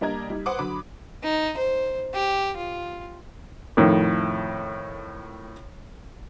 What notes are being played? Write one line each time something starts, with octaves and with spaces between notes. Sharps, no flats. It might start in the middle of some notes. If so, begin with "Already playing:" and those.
G3 A#3 D4 D#5 A#5 G#6
G3 D#4
B4 C5 F#5 C6 D6 D#6
D3 F#3 B5 D6
D#4
C5
G4
F4
F2 A2 D#3